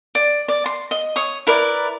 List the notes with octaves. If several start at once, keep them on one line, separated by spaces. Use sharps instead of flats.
D5
D5
C6
D#5
C#5 D#6
E4 A#4 B4 D5